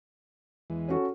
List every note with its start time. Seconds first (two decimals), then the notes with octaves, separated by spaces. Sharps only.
0.70 E2 E3 G#3
0.88 C#4 F#4 A4